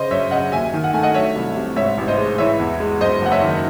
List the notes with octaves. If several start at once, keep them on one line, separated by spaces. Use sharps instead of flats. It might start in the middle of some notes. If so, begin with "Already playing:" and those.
Already playing: C#3 C5 D#5
F#2 C#5 E5
C#3 D#5 F#5
D#2 E5 G#5
D#3
F#5
A3 G#5
D#5 F#5
F#3 C#5 E5
C2
C3
G#2 C#5 E5
A1
C5 D#5
G#3
E3 C#5 E5
E2
G#3
F#2 C5 D#5
F#1 F#5
C#5 E5
D#3